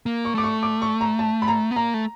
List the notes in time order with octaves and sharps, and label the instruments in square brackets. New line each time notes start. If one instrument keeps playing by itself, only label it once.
[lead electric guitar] A#3
[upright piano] C#6
[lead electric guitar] A3 [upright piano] D6
[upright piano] C#6
D6
C#6
A#5
A5
B5
A#5
[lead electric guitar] B3
[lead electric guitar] A#3 [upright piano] A#5
[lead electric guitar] A3